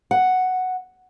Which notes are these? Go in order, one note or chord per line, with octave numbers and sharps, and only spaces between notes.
F#5